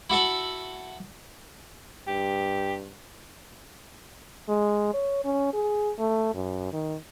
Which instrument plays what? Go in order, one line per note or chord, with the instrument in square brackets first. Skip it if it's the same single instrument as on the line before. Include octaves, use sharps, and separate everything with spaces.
[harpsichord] E4 F#4 A4 E5
[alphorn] G2 [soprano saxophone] G4
[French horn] G#3
C#5
C#4
G#4
A3
F#2
D#3